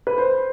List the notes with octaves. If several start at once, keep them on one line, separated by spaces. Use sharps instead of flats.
B4
C5